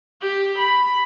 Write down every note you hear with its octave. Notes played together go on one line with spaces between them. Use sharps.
G4
B5